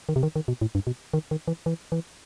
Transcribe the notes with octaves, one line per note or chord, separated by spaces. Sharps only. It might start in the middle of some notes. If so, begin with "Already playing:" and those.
D#3
C3
D#3
D#3
B2
A2
G2
B2
D#3
D#3
E3
E3
E3